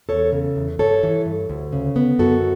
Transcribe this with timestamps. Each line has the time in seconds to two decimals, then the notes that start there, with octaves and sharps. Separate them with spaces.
0.09 E2 A4 C#5
0.32 C#3
0.56 E2
0.79 G2 A4 C#5
1.03 E3
1.25 G2
1.50 D2
1.72 C#3
1.96 B3
2.19 F#2 F#4 A4